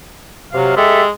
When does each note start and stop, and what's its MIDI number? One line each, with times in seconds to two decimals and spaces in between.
0.53 0.74 48
0.53 0.74 54
0.53 0.74 77
0.76 1.10 56
0.76 1.03 67
0.76 1.03 69
0.76 1.03 76